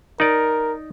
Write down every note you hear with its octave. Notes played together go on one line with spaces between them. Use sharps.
D#4 A#4 D5